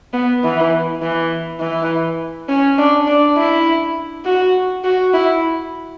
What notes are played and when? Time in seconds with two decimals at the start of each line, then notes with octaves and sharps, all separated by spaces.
0.13 B3
0.44 E3
1.02 E3
1.60 E3
2.49 C#4
2.78 D4
3.07 D4
3.37 E4
4.25 F#4
4.84 F#4
5.14 E4